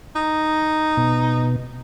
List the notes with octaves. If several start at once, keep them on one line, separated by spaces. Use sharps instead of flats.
D#4
B2